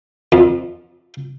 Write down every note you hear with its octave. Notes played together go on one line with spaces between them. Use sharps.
F2